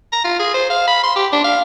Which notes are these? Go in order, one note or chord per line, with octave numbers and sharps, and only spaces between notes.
A#5
F4
G#4
C5
F5
B5
C6
G4
D4
F5